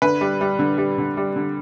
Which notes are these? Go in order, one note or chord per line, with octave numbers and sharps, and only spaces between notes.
D3 B4
G3
G3
D3
G3
D3
G3
D3